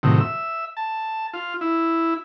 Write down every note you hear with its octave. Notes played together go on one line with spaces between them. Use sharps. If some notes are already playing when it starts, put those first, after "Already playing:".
A2 C3 D#3 F#3
E5
A5
F4
E4